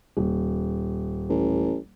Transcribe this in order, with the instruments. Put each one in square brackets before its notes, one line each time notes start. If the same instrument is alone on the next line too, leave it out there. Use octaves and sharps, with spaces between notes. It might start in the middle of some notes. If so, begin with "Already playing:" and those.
[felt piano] D#1
[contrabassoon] A1